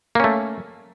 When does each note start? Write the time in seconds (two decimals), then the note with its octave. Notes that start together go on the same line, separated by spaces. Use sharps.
0.15 A#3
0.20 C#4
0.24 A3